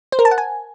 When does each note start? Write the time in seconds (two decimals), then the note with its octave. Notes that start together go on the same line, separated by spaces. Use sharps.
0.12 C5
0.19 A#4
0.25 A5
0.31 F#5
0.38 G#5